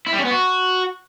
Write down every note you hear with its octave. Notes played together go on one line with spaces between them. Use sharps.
E4
G3
C#4
B3
F#4